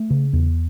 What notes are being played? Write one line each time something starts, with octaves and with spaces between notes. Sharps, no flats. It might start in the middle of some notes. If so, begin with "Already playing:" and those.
Already playing: A3
C#3
E2